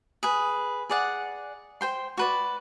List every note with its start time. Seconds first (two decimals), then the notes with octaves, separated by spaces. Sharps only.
0.23 G#4 B4
0.90 G#4 D5 F#5
1.81 C5 G5 C6
2.17 F#4 B4 D5